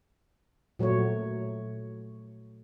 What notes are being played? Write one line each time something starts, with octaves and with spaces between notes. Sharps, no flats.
A#2 F#3 A3 C#5